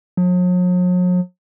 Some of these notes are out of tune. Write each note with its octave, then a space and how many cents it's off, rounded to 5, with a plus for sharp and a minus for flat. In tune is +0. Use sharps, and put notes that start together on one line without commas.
F#3 -45